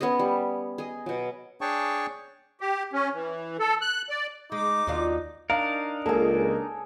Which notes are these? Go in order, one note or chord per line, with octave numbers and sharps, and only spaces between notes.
B3 C#4 G#4 D#5
G3
G#4 D#5
B2 F#3
D4 G#4 C#5 G5 A5 C#6
G4
C#4
E3
A4
F#6
D5
G#3 D#4 D6
D#2 F#3 D4 F4
D4 D#4 A#4 F5
C#2 A#3 G#4 A4